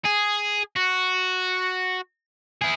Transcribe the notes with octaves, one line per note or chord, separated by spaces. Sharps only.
G#4
F#4
E4 G#4